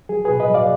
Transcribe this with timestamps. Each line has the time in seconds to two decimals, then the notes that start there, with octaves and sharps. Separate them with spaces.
0.09 F#3 G#4
0.25 B2 G#4 B4
0.40 B4 D#5
0.50 F#3 D5 F5